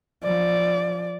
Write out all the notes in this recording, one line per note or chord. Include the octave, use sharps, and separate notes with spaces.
F3 D5